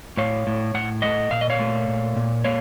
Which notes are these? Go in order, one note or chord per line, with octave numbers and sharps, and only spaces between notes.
A2 C#5 F5
A2
A2 F#5
A3 D#5 F#5
A#2 F5
D#5
C#5 F5
A3
A#2
A#2
A#3 C#5 F5